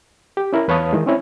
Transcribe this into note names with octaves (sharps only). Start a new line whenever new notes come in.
G4
C#4 E4 A#4
E2 B4 C#5 F5 A5 D#6
D#3 E3 G#3
C4 C#4 E4 C#5